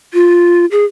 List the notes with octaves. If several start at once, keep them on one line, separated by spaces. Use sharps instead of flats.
F4
G#4